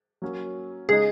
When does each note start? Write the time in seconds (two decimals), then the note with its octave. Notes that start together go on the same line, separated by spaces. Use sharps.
0.22 F#3 A#3 C#4
0.89 C#3 G#3 D#4 G#4